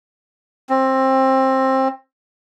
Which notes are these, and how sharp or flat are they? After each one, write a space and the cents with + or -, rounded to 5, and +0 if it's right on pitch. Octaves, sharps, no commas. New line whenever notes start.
C4 +20